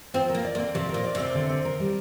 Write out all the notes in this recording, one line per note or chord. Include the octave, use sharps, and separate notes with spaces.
F3 C4
A#4
A#3
D5
A#3
C4
C3 F3
A#4
A#2
D5
C3 C4
D3
C4
A#4
G3